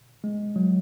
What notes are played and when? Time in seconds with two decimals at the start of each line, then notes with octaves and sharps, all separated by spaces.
0.24 G#3
0.56 F#3